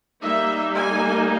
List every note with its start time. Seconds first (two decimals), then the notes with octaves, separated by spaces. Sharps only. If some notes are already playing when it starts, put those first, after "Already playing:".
0.22 G3 A#3 D#4 E5
0.74 G#5